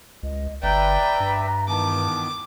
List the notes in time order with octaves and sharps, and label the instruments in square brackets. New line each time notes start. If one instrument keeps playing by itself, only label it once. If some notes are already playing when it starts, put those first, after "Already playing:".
[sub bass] C#2 [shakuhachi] D#5
[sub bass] G1 [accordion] B4 D5 E5 [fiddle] G5 [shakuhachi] A#5
[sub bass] G2
[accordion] D#3 E3 B3 [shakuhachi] A5 [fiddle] D6